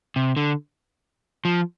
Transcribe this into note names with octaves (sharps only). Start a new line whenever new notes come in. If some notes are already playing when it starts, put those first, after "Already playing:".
C3
D3
F3